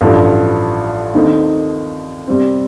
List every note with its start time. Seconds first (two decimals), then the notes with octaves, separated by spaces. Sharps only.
0.01 A1 G2 F3 A3
1.14 D#2 D#3 A3 C4 D#4
2.27 C3 G3 C4